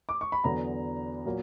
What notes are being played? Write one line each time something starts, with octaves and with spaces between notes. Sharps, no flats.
D6
C#6
B5
E2 D3 F#3 B3 A#5
A#2 F#3 A#3